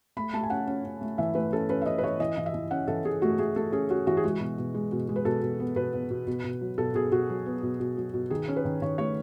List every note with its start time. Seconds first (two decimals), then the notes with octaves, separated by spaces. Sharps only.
0.17 A3 B5
0.33 A3 A5
0.43 G#5
0.50 C#4 F#5
0.67 C#4
0.84 C#4
1.01 A3
1.18 E3 E5
1.35 A3 B4
1.52 C#4 A4
1.69 C#4 B4
1.82 E5
1.86 C#4 D#5
1.98 B4
2.03 E3 C#5
2.20 E3 D#5
2.37 E3
2.46 E5
2.54 E3
2.71 C#4 F#5
2.87 E3 A4
3.04 E3 G#4
3.22 A3 F#4
3.38 A3 G#4
3.56 A3 A4
3.72 C#4 G#4
3.89 C#4 F#4
4.07 E3 F#4
4.17 G#4
4.23 G#3 F#4
4.40 B2
4.58 B2
4.74 G#3
4.92 B2
5.09 G#3
5.16 B4
5.25 B2 A4
5.42 B2
5.60 B3
5.76 B2 B4
5.93 B3
6.10 B2
6.27 B2
6.44 B2
6.61 F#3
6.78 B2 A4
6.94 B2 G#4
7.11 B2 F#4
7.30 F#3
7.46 B3
7.63 B2
7.80 B2
7.97 F#3
8.14 B2
8.30 D#3 G#4
8.48 C#4
8.56 B4
8.65 D#3
8.82 D#3 C#5
8.98 A3 C#5